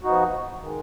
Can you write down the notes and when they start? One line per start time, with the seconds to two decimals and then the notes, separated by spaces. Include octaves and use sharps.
0.03 F3 B3 D#4 F#4
0.62 D#3 G#3